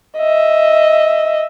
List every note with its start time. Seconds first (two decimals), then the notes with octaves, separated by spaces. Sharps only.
0.18 D#5 E5